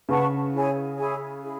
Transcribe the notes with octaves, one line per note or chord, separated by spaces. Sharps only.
C#3 B4 F#5 A5 C#6
E4 G#4 C#5 G#5
E4 G#4 C#5 G#5
E4 G#4